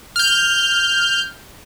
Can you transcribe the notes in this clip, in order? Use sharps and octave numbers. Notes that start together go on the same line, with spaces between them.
F6 G6